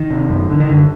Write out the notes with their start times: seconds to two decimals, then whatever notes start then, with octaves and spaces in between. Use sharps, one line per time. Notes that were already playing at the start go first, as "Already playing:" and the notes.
Already playing: D#3
0.11 C3
0.30 F#2
0.50 D3
0.60 D#3
0.69 F#2 D3